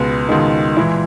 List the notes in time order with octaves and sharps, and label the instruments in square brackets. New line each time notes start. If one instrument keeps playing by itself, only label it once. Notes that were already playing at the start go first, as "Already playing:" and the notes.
Already playing: [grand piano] C#2 B2 G#3 [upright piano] B3
[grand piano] C#2 B2 G#3 [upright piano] D#3 D#4
[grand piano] A#2 G#3 [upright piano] E3 E4